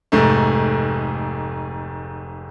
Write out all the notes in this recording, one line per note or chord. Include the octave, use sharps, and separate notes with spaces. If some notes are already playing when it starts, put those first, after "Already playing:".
F1 G#2 A3